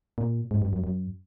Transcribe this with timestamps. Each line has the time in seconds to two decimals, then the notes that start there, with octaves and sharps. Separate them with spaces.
0.18 A#2
0.51 G#2
0.62 G2
0.73 F#2
0.84 F#2